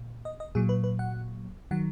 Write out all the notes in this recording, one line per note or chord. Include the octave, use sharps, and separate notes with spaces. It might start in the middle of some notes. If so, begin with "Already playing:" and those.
Already playing: A#2
D#5
D#5
A#2 F#3 G#4
B4
B4
F#5
D#3 F#3 F#5